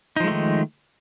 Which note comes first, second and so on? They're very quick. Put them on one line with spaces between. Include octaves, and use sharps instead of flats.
D#4 F3 G#3 A3 D#3